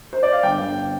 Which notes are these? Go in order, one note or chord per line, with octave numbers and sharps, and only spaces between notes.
C5
D5
F5
G1 G5
G1